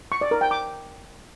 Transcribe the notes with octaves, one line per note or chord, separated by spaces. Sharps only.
C#6
D5
A#4
G5
D6